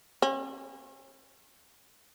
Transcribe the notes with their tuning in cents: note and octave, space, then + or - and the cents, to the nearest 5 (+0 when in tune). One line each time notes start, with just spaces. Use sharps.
C#4 -45